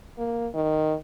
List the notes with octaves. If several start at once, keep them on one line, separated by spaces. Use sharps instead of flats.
A#3
D#3